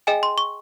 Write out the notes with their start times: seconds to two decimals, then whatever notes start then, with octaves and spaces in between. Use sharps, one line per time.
0.07 G#4 D#5 G5 G#5
0.23 C6
0.38 C#6